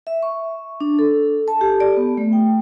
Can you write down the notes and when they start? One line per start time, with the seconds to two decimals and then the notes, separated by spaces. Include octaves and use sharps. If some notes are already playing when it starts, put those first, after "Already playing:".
0.07 E5
0.23 C#6
0.80 D4
0.99 A4
1.48 A5
1.61 G4
1.80 D5
1.96 B3
2.17 A3
2.33 G5